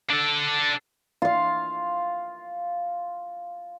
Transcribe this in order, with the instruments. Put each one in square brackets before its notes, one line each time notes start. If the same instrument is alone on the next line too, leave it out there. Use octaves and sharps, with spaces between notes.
[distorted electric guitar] D4 A4
[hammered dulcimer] F4 F5